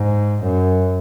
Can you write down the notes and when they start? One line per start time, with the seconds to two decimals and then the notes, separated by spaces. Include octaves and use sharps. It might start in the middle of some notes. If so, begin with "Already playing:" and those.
Already playing: G#2
0.43 F#2